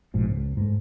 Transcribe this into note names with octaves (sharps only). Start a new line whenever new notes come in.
A#1 G#2 B2
C#2
G#2 A3